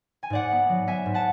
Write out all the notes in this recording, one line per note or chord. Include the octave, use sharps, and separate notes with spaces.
G#5
G#2 D5 F#5
B3
F#3
B3 E5 G#5
G#2
F#5 A5